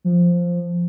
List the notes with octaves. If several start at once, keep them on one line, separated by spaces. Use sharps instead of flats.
F3